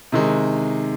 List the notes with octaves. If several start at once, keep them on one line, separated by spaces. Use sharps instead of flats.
C3 D#3 G#3